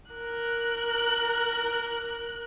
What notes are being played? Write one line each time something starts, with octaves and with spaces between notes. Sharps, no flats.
A#4 F#6